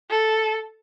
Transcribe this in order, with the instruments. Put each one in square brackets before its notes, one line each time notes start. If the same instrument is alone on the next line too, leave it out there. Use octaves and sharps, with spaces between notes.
[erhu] A4